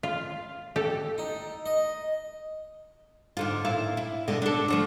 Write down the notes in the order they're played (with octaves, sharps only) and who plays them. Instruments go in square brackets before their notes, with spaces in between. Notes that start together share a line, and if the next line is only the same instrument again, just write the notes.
[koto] F4
G4 A4
[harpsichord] D#4
D#5
[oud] G#2 D3 F4
A#2 E4 F5
E4
B2 D3 G#3
D4 A4
D3 F3 A3